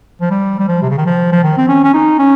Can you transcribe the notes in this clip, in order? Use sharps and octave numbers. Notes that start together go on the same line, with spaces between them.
F3
G3
G3
F3
C3
C#3
D#3
F3
F3
D#3
C4
C#4
C#4
D#4
C#4